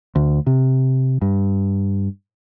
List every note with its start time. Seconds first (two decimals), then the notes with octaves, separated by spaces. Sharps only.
0.16 D2
0.47 C3
1.22 G2